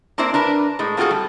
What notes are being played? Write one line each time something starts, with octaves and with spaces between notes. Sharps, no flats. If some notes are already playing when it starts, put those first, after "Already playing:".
A#3 C4 D4 E4 C5 D5
D4 A#4 B4
A2 G#3
A#3 C4 F4 F#4 G#4 A4
G3